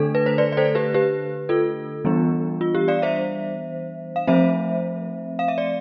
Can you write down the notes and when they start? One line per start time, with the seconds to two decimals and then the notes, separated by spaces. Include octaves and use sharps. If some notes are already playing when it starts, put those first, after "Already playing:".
Already playing: D3 A3 D4 A4
0.15 B4
0.26 C5
0.38 B4 D5
0.52 D5
0.57 A4 C5
0.75 G4 B4
0.94 G4 B4
1.49 F4 A4
2.05 E3 G3 B3 D4
2.61 F4
2.75 G4
2.88 D5 F5
3.02 C5 E5
4.16 F5
4.27 F3 A3 C4 C5 E5
5.39 F5
5.48 E5
5.58 D5